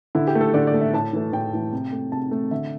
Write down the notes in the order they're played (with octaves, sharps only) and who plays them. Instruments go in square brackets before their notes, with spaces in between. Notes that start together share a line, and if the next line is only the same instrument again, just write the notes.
[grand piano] D3 E4
G4
A3
A4
D3 D5
D5
A3
E5
A2 A5
E3 A3
A2 G5
E3 A3
C3
A3
C3 A5
A3
D3 E5